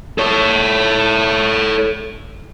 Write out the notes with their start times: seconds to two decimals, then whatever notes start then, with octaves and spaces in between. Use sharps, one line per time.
0.18 A4 C#5